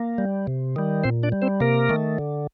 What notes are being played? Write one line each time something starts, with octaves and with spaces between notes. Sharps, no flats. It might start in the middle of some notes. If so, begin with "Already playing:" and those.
Already playing: A#3
G3
C3
D#3 G3
A#2 C4 C5
D4 D5
G3
C4 C5
C3 A#3 A#4
D#3 A3
D3